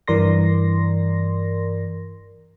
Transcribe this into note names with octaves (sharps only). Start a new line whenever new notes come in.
G2 E3 A#4 D5 C6 A#6